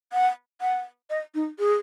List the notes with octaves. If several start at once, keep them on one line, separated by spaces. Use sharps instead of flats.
F#5
F#5
D#5
D#4
G#4